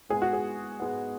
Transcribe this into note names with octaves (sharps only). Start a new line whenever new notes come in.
G#2 G#3 B3 G#4
F#4
G#4
G#2 G#3 B3